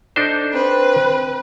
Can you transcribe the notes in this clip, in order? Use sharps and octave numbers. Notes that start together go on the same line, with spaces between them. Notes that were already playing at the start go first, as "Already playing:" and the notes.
D4 D#4 A4 C5
C4 B4